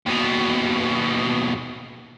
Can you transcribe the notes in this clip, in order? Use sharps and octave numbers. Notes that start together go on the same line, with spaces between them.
D#2 B2